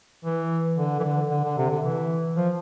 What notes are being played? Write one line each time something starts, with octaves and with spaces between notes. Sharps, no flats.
E3
D3
E3
D3
D3
D3
C3
D3
E3
F3